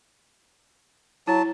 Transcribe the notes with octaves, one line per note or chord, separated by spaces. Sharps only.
F#3 E4 A5